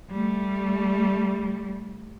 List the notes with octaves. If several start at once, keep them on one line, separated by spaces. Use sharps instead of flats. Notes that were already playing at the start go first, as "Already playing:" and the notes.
G3 A3